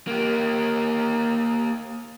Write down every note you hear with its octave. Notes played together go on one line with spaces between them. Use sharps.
A#3 G4